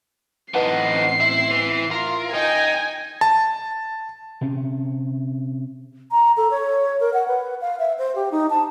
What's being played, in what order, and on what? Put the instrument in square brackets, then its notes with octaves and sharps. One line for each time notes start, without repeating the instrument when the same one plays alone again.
[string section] A1 C4 [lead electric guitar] E3 D#4 [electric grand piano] B4 F#5 A5 [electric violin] C7
[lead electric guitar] E4 [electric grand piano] E5
[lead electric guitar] E3
[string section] F4 [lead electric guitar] A#4
[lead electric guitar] D#4 [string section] G5 [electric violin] G#5
[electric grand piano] A5
[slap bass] C3 C#4
[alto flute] A#5
A4
C#5
A#4
F#5
B4
F5
E5
C5
G4
D#4
A5